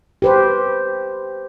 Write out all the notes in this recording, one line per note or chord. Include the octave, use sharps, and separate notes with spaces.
G4 B4 C5